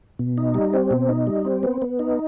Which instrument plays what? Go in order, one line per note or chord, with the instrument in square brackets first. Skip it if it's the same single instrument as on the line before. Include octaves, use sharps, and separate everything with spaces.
[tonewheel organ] B2
D#4
G3
C4
B2
D#4
G3
C4
B3
B3
D#4